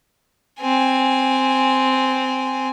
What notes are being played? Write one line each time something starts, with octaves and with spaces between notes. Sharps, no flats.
C4 G#5